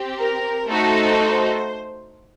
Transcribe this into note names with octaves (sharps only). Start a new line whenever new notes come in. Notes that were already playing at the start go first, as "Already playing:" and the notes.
Already playing: C4 G4
A#4
A3 D#4 F#4 A4 C5